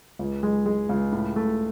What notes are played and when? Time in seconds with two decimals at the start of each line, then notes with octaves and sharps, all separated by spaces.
0.19 C#2
0.43 G#3
0.66 G#3
0.89 C#2
1.12 A2
1.36 A3